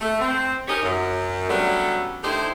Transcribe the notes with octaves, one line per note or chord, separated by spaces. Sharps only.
A3
C4
C#4 D#4 G4 A#4 C#5 D#5
F#2
F#3 G3 A3 B3 C#4 D4
D3 A3 D#4 E4 G4 C5